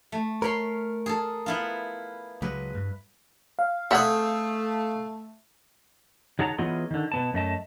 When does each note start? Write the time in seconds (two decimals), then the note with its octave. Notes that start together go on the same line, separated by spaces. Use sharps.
0.12 A3
0.42 A#4 C#5 B5 C6
1.06 G#4 A4
1.46 B3 E4 F4
2.42 C#2 F#3 G#3 B4
2.75 G2
3.59 F5
3.91 A3 C4 G#4 A4 E5 F#5
6.39 D#3 F#3 G#4 F#5 A5 A#5
6.58 E3 F#3 B3 F4 G#4 D#5
6.91 D3 D#3
7.12 B2 B3 A5
7.33 F#2 A3 D#5 A5